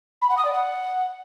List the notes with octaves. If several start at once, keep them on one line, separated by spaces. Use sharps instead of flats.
B5
F#5
D#6
D5
F#5